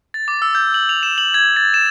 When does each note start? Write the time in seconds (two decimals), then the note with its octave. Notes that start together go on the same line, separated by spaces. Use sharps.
0.14 A6
0.28 D6
0.42 E6
0.55 G6
0.74 F#7
0.89 F7
1.03 E7
1.18 F#7
1.34 G#6
1.56 A6
1.74 E7